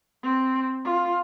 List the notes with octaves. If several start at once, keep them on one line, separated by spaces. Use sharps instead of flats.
C4
F4